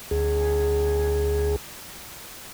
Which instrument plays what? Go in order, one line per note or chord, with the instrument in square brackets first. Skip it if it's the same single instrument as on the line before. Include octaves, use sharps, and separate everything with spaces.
[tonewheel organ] D2 G#4